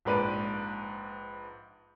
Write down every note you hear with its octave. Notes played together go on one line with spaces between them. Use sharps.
A#1 G#2 B4 D5 D#7